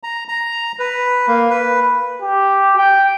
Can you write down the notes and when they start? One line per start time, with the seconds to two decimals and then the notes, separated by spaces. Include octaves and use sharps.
0.03 A#5
0.28 A#5
0.79 B4
1.28 A#3
1.50 B4
2.21 G4
2.77 G5